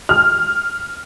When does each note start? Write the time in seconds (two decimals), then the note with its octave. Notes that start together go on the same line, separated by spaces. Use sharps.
0.09 F6